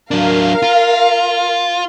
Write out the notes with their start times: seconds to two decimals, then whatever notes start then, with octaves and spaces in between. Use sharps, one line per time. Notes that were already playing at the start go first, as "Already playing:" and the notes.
0.11 F#3 D4 A#4 F5
0.62 F4